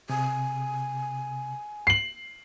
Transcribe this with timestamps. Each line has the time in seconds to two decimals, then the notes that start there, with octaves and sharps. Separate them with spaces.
0.09 C3 G#5
1.87 C7 F#7